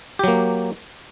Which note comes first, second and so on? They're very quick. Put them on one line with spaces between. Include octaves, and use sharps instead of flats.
G4 F#3 A#3